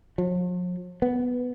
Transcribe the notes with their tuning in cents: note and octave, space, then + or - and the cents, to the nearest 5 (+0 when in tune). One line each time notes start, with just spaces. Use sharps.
F3 +45
B3 +5